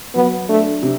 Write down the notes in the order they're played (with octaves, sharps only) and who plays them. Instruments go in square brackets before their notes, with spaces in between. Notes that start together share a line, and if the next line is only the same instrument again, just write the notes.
[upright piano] F#3 [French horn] B3
[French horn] A3 [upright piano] D4
[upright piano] C3